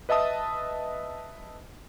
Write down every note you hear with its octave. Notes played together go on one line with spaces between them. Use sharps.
B4 D#5 E5 A5 D#6